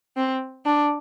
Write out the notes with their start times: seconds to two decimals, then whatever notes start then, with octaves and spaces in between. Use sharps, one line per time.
0.17 C4
0.66 D4